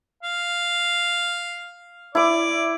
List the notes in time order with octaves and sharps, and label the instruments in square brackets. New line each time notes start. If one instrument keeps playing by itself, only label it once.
[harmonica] F5
[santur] E4 D6 [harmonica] D5